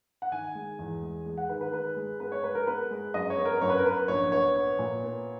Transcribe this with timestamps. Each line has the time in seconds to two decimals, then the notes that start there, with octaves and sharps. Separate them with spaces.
0.22 F#5
0.32 D#3 G#5
0.55 G#3
0.79 E2
1.02 G#3
1.26 G#3
1.38 F#5
1.49 D#3 B4
1.61 B4
1.73 G#3 B4
1.96 G#3
2.20 B3 B4
2.32 C#5
2.44 G#3 B4
2.55 A#4
2.67 B3 B4
2.91 G#3
3.14 F#2 D#5
3.30 C#5
3.37 B3
3.45 A#4
3.61 F#2 C#5
3.69 B4
3.78 A#4
3.84 B3 B4
4.08 A#1 C#5
4.32 B3 C#5
4.56 B3
4.79 A#2
5.03 B3